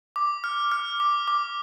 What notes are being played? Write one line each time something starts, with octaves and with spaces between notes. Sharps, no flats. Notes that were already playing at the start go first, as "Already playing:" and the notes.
D6
F6
F6
D6
D6